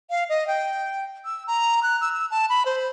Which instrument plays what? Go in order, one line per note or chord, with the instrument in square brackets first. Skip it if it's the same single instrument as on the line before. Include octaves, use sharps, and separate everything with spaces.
[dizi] F5
D#5
G5
E6
A#5
F#6
E6
E6
A5
B5
C5